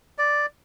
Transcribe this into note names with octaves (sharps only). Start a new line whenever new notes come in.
D5